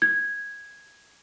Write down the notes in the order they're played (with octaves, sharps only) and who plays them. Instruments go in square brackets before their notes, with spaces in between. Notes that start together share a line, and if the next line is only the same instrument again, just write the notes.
[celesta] G#6